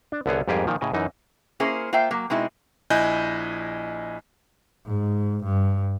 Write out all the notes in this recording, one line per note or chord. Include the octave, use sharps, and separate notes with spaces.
D4
C2 D3 B3 G#4 C#5
F2 G#2 G3 G4 G#4 A#4
A#2 D#3 F3
A2 C#3 D#5 G#5
F#2 E3 D#4
A#3 C#4 E4 G#4 A#4 C5
A#3 F4 C5 E5 G5
F#3 A#3
B2 G#3 C4 D#4 E4
A#1 E4 D#5 G#5 F#6 G6
G#2
G2